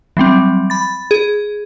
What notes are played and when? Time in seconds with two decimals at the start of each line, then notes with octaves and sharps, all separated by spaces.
0.17 E3 F#3 G3 C4
0.70 B5 A6
1.11 G#4